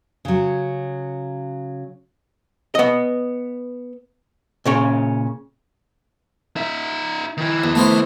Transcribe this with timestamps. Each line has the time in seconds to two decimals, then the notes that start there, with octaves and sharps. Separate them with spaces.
0.25 C#3 F#3
2.75 B3 D#5
4.66 A#2 C#3 C#4
6.56 D#4 E5
7.37 D#3 E4
7.64 E2
7.75 A3 B3 C5